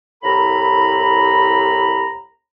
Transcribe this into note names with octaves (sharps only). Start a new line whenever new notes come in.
C2 A2 A#4 A#5 B5